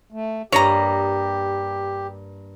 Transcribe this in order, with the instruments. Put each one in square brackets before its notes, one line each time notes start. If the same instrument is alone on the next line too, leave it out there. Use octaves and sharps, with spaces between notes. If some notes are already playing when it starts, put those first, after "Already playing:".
[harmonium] A3
[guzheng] G2 A#3 D#5 [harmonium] G4 [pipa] C#5 A#5